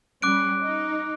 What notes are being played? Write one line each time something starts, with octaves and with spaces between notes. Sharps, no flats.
G3 C#4 D6 F#6 D7
D#4